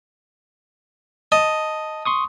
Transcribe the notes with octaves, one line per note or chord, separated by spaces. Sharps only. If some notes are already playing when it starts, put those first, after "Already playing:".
D#5 A5
C6 C#6 D#6